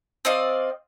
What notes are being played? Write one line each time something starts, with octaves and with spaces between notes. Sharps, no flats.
C4 D5 D#5 F5